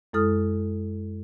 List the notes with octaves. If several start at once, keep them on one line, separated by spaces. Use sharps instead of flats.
F#2 G#3 E4 A4 D#6 F6